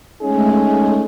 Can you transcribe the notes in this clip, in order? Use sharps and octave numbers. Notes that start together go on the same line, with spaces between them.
G#3 A3 C#4 D#4 G#4